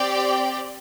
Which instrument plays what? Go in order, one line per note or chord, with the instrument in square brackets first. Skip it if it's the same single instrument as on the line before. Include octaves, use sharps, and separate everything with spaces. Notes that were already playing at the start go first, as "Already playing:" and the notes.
Already playing: [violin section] C4 G4 D5 G5